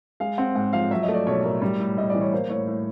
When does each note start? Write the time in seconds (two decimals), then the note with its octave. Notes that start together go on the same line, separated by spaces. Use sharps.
0.20 G#3 F5
0.38 C4 F#5
0.55 G#2 F#5
0.73 F3 F5
0.91 F#3 E5
1.03 D#5
1.09 A3
1.14 D5
1.27 B1 C#5
1.44 A2 A#4
1.62 G3
1.79 A2
1.97 A2 D#5
2.10 E3 D5
2.21 C#5
2.33 A#3 C5
2.49 A2 C#5
2.67 A2